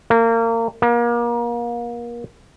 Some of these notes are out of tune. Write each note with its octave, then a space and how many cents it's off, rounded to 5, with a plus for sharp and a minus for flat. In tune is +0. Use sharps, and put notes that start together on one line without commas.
A#3 -30
A#3 +30